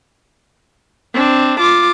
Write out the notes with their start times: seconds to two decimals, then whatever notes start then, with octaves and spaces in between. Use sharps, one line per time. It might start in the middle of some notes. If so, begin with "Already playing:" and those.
1.14 C4 D4
1.60 F4 D6